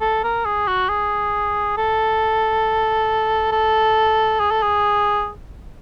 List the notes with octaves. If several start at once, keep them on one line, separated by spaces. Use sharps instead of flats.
A4
A#4
G#4
F#4
G#4
A4
A4
G#4
A4
G#4